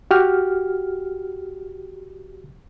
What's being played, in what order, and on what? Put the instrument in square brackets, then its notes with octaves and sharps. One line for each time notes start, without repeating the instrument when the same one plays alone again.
[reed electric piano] F#4 G4 F6